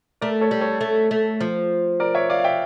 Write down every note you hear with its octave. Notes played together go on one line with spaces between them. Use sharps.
A3 A#4 D5
A4 C#5
G3
A4 C#5
A3
A3
F3
A#4 D5
C#5 E5
D5 F5
F5
E5 G5